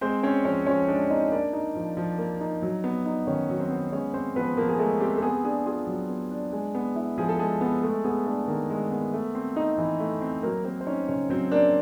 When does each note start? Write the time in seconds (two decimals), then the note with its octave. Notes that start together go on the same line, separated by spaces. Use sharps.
0.01 G#3 C4 C5
0.23 C4 C#4 C#5
0.45 F3 C#4 C#5
0.66 F3 C#4 C#5
0.88 G#3 D4 D5
1.10 C4 D#4 D#5
1.32 A#3 D4 D5
1.53 D#4
1.75 F3
1.97 F3
2.18 A#3
2.40 D#4
2.62 F#3
2.84 B3
3.06 D#4
3.27 D#3 C#4 C#5
3.49 F#3
3.60 C4 C5
3.71 B3
3.92 G#3 C#4 C#5
4.14 C4 C5
4.36 F3 B3 B4
4.57 F3 A#3 A#4
4.69 G#4
4.79 G#3 A3 A4
5.01 C4 G4
5.17 A4
5.22 B3 G#4
5.44 D4 G#4
5.66 F4 G#4
5.87 F#3
6.09 B3
6.31 D4
6.53 G#3
6.75 B3
6.96 E4
7.18 F3 G#4
7.29 A4
7.39 G#3 G#4
7.61 B3
7.83 G#3 A3 A4
8.04 B3 G#4
8.26 A3 D4 A4
8.48 D#3 A#3 A#4
8.70 G#3
8.91 B3
9.13 A3
9.35 C4
9.56 D#4
9.78 E3
10.00 A3
10.21 C4
10.43 F#3 A#3 A#4
10.65 A#3 C4 C5
10.81 C5
10.86 C#4 D#4 C#5
11.08 C#3 C#4 C#5
11.30 F#3 C4 C5
11.52 A#3 D4 D5